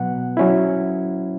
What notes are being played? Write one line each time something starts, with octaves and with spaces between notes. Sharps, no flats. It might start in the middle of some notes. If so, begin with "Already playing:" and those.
Already playing: B2 F#3 B3 F#5
F#3 C#4 E4